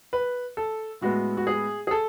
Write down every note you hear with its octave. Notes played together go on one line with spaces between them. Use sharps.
B4
A4
A2 G#3 B3 F#4
F#4
G#4
G#4
A4